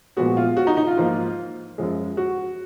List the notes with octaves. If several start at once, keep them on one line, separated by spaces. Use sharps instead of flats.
A#2 F3 G#3 B3 F#4
F4
F#4
D#4
D#4
F4
G#2 F3 A#3
F#2 F3 G#3
F#4